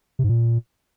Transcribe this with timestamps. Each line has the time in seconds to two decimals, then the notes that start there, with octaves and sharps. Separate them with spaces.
0.19 C3
0.24 G#2
0.29 A#2